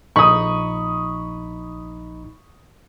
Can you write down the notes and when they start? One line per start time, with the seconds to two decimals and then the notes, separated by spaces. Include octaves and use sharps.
0.16 A#1 D#4 B5 C#6 D#6